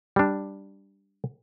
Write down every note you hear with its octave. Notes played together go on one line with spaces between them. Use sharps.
G3 D4